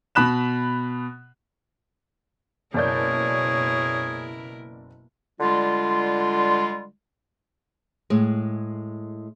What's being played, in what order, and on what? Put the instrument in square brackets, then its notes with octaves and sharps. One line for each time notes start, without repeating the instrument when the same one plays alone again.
[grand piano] B2 B5 F#6 E7
[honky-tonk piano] F#1 D5 G6 [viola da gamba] B2 E4 A#4 [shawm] G#4 [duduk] C#5
[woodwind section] D3 G3 G#3 F4
[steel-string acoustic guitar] A2 G#3